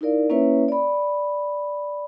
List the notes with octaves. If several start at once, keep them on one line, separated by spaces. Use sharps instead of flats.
D#4 E4 A#4 D5 F5
A#3 C#4 E4 B4 C#5 E5
D5 B5